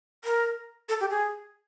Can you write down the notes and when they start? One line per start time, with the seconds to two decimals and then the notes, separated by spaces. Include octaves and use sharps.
0.24 A#4
0.89 A4
1.00 G4
1.10 G#4